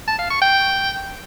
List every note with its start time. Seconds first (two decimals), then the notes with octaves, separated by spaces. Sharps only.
0.08 A5
0.19 F5
0.30 C#6
0.41 G5